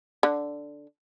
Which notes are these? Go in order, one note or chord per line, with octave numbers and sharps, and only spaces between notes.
D3